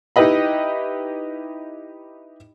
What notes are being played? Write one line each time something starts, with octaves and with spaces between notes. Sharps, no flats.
D#4 E4 G4 B4 D#5 B5